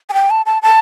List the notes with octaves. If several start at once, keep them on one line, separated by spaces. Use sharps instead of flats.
G#5
G5
A5
A5
A5